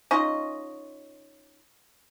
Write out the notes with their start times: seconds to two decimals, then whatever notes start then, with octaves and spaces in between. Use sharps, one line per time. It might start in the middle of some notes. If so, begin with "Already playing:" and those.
0.11 C#4 D#4 F4 D#5